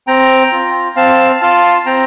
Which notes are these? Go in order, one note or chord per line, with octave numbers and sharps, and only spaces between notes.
C4 G5 A#5
F4
C4 F5 A5
F4 F5 A5
C4 G5 A#5